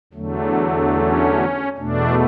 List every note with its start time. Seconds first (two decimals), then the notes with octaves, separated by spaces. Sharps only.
0.13 E2 D3 F#3 A3
0.94 C#4
1.78 E2 B2 A3 D4